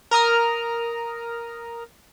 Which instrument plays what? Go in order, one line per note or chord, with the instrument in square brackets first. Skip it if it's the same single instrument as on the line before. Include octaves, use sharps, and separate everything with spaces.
[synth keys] A#4 A#5 D#6 F6